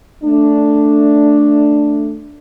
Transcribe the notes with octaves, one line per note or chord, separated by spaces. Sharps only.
A3 D4